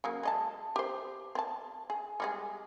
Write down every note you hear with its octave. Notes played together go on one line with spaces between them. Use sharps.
C#3 F#3 A#3
G#3 D#5 A5
G4 C5
C4 A5
G#4
G3 G#3 G#4